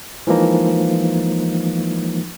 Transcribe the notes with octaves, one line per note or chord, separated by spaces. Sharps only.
E3 F3 G#3 A#3 D#4